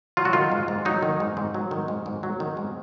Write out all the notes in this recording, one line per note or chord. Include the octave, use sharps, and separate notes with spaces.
F#3 F4
F#4
D#3 F4
G#2
G#2
F#3 D#4
D#3
G#2
G#2
F#3
D#3
G#2
G#2
F#3
D#3
G#2